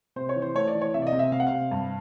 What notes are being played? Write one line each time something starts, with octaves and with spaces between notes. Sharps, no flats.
C3 C5
C#5
E3
C5
A3 C#5
D5
E3
C#5
C3 E5
D5
D#5
C3
E5
C3 F5
F#5
C3 F5
G2